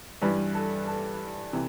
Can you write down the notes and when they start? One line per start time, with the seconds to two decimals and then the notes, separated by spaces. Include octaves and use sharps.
0.22 G2 E3 G3 B4
0.54 A4
0.87 A4
1.53 C3 E3